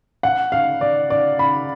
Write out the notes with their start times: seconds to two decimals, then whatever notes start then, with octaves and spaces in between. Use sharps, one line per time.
0.23 F#5
0.52 F5
0.81 D5
1.10 D5
1.39 B5